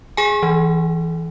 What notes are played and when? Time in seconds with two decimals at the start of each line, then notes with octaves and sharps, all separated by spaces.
0.17 G#4 G#5
0.43 E3